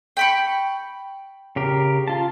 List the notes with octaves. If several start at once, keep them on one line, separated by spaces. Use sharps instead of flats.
G5 B5 C#6
C#3 G4 A#4
F4 A5